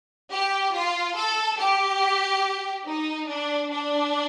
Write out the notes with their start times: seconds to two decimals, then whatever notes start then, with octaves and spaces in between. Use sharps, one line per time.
0.31 G4
0.74 F4
1.15 A4
1.58 G4
2.85 D#4
3.27 D4
3.70 D4